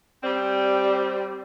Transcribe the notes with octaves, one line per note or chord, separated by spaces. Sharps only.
G3 C4